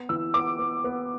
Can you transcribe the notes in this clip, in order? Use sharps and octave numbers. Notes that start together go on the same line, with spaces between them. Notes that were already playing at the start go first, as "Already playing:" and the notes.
Already playing: B3
E3 E6
B3 D6
B3
B3